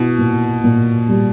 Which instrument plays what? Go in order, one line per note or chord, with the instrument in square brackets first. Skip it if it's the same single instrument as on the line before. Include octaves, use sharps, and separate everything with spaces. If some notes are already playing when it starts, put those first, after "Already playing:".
Already playing: [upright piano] B2 [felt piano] E4
[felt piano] A#2
A#2
G3